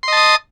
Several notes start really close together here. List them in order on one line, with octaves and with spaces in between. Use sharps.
C6 D#5 A5 D#6